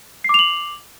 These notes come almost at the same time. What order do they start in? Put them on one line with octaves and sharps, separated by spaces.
C7 D6 F7 F#7